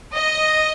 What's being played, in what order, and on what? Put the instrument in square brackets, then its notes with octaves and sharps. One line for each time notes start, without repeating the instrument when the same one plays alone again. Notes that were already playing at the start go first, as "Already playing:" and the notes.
[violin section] D#5